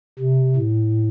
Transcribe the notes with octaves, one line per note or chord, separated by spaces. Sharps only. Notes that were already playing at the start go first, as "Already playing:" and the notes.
C3
A2